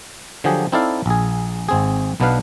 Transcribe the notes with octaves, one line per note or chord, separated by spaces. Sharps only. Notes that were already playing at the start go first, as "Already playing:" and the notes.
D3 F3 F#3 G4 G#4
C4 D#4 E4 A4 D5 F5
A#1 G#4
G#1 C4 G#4
B1 B2 B3 D4 B4 F5